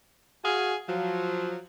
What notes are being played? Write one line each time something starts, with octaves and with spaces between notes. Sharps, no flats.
F#4 G#4 F5 G#5
F3 F#3